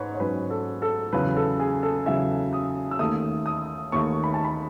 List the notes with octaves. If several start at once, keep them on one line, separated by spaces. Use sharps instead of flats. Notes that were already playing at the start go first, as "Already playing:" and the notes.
Already playing: G#2 B4 C#5
C#5
G#2 F#3 C#4 B4
A4
A4
E2 C#3 F#3 B4
A4
G#4
A4
E2 C#3 F#3 E5
D#6
E6
D#2 D#3 A3 D#6
D#6
D#2 D#3 A3 C#6
B5
A5
B5